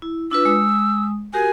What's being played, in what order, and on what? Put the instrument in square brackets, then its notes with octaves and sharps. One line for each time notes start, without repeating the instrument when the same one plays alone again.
[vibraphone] E4
[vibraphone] D4 F4 B4 [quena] E6
[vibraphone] G#3 D#6
[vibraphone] F#4 G4 A#4 [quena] G#5